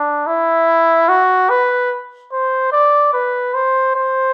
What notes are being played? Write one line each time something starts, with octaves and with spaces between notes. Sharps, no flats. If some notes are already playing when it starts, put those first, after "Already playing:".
Already playing: D4
E4
F#4
B4
C5
D5
B4
C5
C5